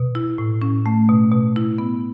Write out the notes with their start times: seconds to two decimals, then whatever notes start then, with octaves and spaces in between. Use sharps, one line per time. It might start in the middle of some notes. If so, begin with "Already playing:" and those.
Already playing: B2
0.15 E4
0.38 A2
0.62 C#4
0.86 A3
1.09 B2
1.32 B2
1.56 E4
1.78 B3